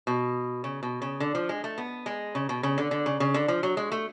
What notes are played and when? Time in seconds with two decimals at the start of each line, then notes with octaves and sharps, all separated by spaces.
0.07 B2
0.64 C#3
0.83 B2
1.02 C#3
1.20 D3
1.35 F3
1.49 G#3
1.64 A3
1.78 B3
2.06 G#3
2.35 C#3
2.49 B2
2.63 C#3
2.78 D3
2.91 D3
3.06 C#3
3.20 C#3
3.34 D3
3.48 F3
3.63 F#3
3.77 G#3
3.92 A3